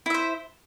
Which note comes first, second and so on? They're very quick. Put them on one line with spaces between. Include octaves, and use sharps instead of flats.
E4 E5 C5